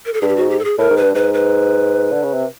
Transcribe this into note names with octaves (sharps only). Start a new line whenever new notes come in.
A#4
A4
G2 G#4
G4
G#2 F#4
G4
A4
G#4
A2 A#4
G#2
B4
G2
G#2 B4
B4
D3
C#3
C3